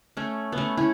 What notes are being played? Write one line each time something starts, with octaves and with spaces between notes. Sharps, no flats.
A3 C#4
B3
A3 C#4
C#4 E4